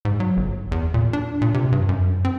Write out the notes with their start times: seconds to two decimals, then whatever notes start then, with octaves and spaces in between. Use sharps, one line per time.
0.05 G#2
0.20 F#3
0.37 G1
0.72 E2
0.94 A#2
1.13 D4
1.42 A#2
1.54 C3
1.72 G2
1.89 F#2
2.25 C4